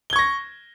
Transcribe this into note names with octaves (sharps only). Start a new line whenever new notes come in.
C#6 G#6 A#6 G7